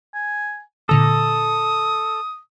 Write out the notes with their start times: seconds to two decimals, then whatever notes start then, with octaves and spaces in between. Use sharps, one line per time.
0.14 G#5
0.89 A#2 D3 A4 D#6 A#6